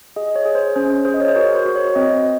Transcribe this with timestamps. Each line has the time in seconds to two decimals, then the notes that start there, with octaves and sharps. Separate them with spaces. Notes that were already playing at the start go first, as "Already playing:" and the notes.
0.16 G#4 D#5
0.36 C#5
0.45 G#4
0.55 C5
0.76 C#4 C5
1.05 G#4 C5
1.14 D#5
1.20 C#5
1.28 C5
1.35 F#4 A#4
1.55 C5
1.65 F#4
1.76 C#5
1.95 C4 D#5